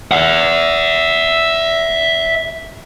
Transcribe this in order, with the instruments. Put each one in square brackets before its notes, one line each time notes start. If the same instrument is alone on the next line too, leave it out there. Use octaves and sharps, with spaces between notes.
[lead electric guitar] E5 F#5